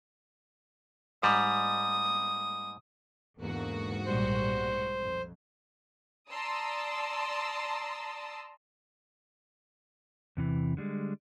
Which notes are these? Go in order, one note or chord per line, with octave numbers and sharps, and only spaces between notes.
G#2 G3 D#6
E2 G#2 D3 A#3 F#4
B1 A#2 G3 C5
F2
D5 A5 A#5 C6 D#6 E6
E2 C3 E3
D3 G3 G#3